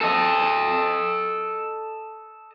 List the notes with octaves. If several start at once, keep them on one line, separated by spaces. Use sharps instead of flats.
A4 D#5